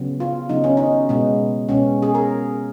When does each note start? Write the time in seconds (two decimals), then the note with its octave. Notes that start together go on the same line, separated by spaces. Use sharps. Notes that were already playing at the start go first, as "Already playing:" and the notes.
Already playing: C#3 F#3 B3
0.20 F4
0.49 C#3 F#3 B3 D#4
0.64 C#4
0.77 D#4
1.09 B2 G#3 B3
1.69 B2 G#3 B3 C#4
2.03 G#4
2.15 A#4